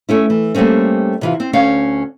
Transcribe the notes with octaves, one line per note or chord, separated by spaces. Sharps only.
A3 C#4 E4
E3
G3 A3 A#3 C4 C#4
C3 E3 F4
C4
D2 C#4 F5